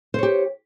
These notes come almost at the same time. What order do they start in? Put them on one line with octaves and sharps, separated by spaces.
C5 C#5 G4